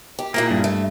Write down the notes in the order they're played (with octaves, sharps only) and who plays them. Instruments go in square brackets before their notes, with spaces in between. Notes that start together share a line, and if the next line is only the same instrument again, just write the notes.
[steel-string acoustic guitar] G4
[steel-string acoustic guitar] A#2 E4 G#4 [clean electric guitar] A#3
[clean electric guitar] G2
[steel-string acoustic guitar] A3